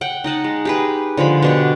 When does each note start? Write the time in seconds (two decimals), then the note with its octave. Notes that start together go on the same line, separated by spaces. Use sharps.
0.01 F#5 G5
0.24 D#4 D#5 F#5 A5
0.44 G#3
0.65 G4 G#4 B4
1.17 D3 F3 G#3 B5
1.42 B2 D4 G4